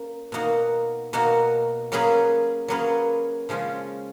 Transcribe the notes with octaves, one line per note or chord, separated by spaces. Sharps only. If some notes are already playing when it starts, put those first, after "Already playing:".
Already playing: A#3 C#4
B2 A#3 D#4 F#4
B2 A#3 D#4 F#4
F#3 A#3 C#4 G#4 B4
F#3 A#3 C#4 G#4 B4
C#3 F3 G#3 C#4 F4